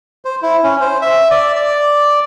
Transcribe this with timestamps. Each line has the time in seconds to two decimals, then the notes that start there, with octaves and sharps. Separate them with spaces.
0.25 C5
0.42 E4
0.64 C#4
0.81 C5
1.02 E5
1.30 D5
1.55 D5